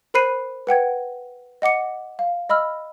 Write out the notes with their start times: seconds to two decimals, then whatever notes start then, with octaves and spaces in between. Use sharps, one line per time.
0.14 A#4 C5 B5 F#6 C7 D#7
0.67 B4 F#5 G5 G#6
1.62 D#5 F#5 D6 C#7
2.19 F5
2.49 D#5 B5 E6 F6